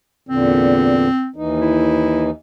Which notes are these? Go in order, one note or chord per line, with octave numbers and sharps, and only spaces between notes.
E2 A#2 D3 C4
D#2 E3 D#4
E4